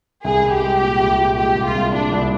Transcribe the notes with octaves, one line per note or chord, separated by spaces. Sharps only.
C2 G#4
C2
G4
G#3
A#2
C2
A#2
G#3 G4
C2
F4
C2
A#2 D4
C2